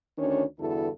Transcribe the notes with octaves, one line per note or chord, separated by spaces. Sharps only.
D2 D#3 C#4 D4 C#5
E2 G2 D3 E4 F#4 A4